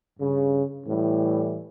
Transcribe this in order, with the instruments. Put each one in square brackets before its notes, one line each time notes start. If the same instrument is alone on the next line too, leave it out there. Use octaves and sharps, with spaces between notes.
[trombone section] G2 C#3
A2 E3 G3